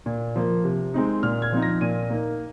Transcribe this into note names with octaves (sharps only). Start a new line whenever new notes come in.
A#2
F3 A#3
C3
G#3 C4 D#4
A#2 F6
G#6
F3 C4 D#4
A#6
A#2 D#7
A#3 D#4